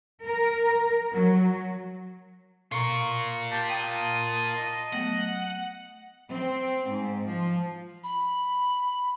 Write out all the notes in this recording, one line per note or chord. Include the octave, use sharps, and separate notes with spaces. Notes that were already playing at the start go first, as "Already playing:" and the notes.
A#4
F#3
B2 F4 A#4 C#6
G4 A5
G5 D#6
D#5
F#3 A3 B3 F#5
C4
G#2
F3
B5